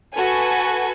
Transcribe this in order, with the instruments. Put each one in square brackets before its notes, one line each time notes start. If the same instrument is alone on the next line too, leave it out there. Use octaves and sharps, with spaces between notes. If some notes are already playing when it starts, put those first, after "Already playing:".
[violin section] F#4 A4 B4 G#5